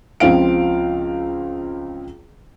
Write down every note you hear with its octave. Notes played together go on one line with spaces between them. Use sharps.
C#2 F3 C4 F5 D7